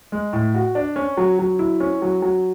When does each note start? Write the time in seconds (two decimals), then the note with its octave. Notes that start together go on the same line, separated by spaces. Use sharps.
0.12 G#3
0.33 A2
0.54 F#4
0.75 D4
0.96 C#4
1.17 F#3
1.39 F#3
1.59 E4
1.80 C#4
2.02 F#3
2.22 F#3